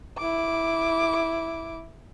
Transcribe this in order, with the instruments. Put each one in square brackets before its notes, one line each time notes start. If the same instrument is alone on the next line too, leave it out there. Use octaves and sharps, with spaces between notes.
[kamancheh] E4 D6